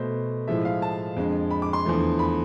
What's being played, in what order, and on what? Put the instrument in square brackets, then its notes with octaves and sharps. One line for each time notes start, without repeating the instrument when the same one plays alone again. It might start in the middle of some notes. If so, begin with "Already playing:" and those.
Already playing: [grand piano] B2 A3 C5
A2 F3 G#3 E5
F5
A5
F2 D3 G#3
B5
D6
C6
E2 D3 F3 A3
B5